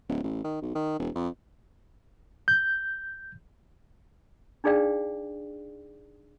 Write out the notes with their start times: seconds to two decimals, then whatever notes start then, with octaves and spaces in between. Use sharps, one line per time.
0.09 D1
0.24 A1
0.44 D#3
0.62 B1
0.75 D#3
0.99 E1
1.15 F2
2.48 G6
4.64 D4 D#4 G#4 D5 F5 G5